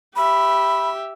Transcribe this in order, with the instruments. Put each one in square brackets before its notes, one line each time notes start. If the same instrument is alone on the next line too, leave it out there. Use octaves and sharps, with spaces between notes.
[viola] G4 E5 [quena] B5